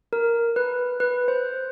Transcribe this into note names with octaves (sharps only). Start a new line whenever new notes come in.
A#4
B4
B4
C5